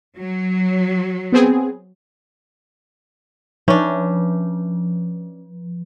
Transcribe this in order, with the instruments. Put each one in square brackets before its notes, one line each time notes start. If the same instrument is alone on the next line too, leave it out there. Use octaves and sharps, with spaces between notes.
[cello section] F#3
[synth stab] B3 C4 G#4
[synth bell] F3 [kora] C#4 D4